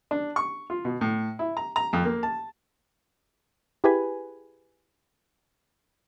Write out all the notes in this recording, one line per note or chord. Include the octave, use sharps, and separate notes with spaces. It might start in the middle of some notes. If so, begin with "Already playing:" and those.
D4
C#6
F4
B2
A2
E4
A#5
A#5
F2
A#3
A5
E4 G4 G#4 B4 G#5 B5